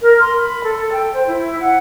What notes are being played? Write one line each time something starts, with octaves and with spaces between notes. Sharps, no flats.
A#4
C6
B5
A4
A4
G5
C5
E4
F#5